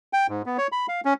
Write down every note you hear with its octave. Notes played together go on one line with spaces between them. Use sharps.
G5
G#2
B3
C#5
B5
F5
C#4